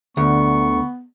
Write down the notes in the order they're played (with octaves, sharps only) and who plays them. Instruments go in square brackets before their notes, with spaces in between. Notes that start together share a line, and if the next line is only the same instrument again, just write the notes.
[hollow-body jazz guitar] D2 [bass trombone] D3 [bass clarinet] B3 [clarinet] C#6